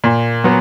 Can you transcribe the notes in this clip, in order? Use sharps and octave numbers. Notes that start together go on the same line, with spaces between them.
A#2
F#3 B3